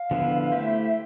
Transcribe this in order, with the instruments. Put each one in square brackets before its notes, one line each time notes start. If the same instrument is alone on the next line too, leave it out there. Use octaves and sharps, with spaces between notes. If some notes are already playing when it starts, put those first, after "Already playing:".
Already playing: [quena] F5
[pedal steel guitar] D3 F3 B3 E4 B4
[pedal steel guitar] A3 E4 G4 C5 [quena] E5